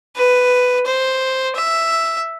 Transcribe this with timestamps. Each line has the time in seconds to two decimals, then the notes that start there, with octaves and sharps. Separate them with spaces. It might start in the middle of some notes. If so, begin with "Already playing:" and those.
0.16 B4
0.86 C5
1.56 E5